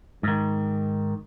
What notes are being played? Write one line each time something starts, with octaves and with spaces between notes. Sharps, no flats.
G#2 D#3